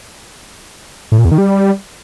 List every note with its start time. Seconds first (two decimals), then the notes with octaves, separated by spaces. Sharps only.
1.12 A2
1.18 A#2
1.25 E2
1.32 D#3
1.38 G3